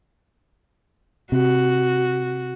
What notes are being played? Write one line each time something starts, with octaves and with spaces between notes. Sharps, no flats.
C3 F#4